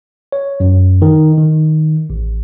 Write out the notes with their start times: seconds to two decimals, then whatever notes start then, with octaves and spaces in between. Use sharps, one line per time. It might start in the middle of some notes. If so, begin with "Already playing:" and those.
0.32 C#5
0.60 F#2
1.02 D#3
1.38 D#3
2.10 A1